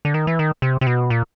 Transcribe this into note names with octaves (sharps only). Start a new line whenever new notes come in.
D3
D#3
E3
D#3
C3
C3
B2
A#2